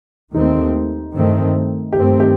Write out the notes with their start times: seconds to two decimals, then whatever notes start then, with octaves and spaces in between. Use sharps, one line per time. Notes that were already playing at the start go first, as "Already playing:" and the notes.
0.34 D#2 D#3 A3 C4 D#4
1.13 G2 D#3 A3 C4
1.93 G2 D#3 A3 C4 G4
2.20 G4